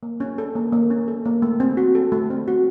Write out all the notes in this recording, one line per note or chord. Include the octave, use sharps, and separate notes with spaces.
A#3
C#4
A4
A#3
A#3
C#4
A4
A#3
A3
C4
F#4
A4
A3
C4
F#4